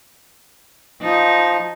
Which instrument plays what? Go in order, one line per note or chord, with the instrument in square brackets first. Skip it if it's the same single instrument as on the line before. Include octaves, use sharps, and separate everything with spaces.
[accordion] F3 [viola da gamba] D#4